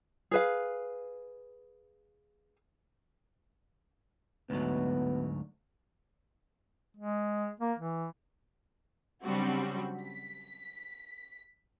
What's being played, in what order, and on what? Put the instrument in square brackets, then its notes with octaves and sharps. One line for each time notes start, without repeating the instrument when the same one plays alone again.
[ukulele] G#4 B4 F5
[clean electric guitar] D2 G#2 F#3 [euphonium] B3
[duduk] G#3
A#3
E3
[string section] C#3 F#3 G3 C4 D4 F#4
B6